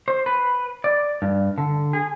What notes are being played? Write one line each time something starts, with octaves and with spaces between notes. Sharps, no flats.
C5
B4
D5
G2
D3
G#4